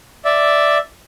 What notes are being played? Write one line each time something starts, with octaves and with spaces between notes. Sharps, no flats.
D5 E5